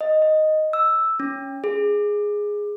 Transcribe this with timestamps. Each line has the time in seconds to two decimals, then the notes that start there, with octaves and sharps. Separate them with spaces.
0.01 D#5
0.22 D#5
0.73 E6
1.20 C#4
1.64 G#4